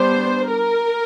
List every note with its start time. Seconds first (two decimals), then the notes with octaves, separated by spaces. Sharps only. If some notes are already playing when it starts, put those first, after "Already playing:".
Already playing: G3 B3 D4 C5
0.50 A#4